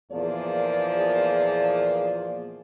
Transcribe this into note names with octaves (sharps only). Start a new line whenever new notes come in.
E2 A#2 F3 A#3 G#4 D5